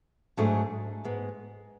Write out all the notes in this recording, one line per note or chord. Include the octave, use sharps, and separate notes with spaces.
G#2 F#3 A3 D4 G#4
G#2 G#3 B3